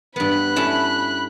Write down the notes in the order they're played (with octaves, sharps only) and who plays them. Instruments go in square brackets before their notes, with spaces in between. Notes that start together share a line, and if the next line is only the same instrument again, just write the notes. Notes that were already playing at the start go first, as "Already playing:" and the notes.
[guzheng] G2 B3 [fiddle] B5 F#6
[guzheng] C#4 E4 A4